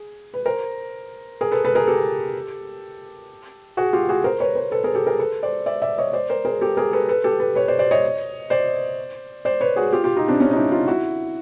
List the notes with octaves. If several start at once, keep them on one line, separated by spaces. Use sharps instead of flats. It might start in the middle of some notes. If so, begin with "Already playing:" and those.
Already playing: G#4
B4
A#4 C5
G#4 A#4
A4 B4
A4 B4
G#4 A#4
G4 A4
F#4 G#4
F4 G4
F#4 G#4
A#4 C5
B4 C#5
A#4 C5
A4 B4
G#4 A#4
G4 A4
G#4 A#4
A4 B4
C5 D5
D5 E5
D5 E5
C#5 D#5
C5 D5
A#4 C5
G#4 A#4
G4 A4
G#4 A#4
A4 B4
A4 B4
G4 A4
A4 B4
B4 C#5
C5 D5
C5 D5
C#5 D#5
C5 D5
C5 D5
B4 C#5
F#4 G#4
F4 G4
F4 G4
D#4 F4
C4 D4
C#4
D#4
D4 E4
D#4 F4
E4 F#4